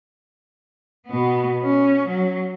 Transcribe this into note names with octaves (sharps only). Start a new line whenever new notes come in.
B2 B3
C#4
F#3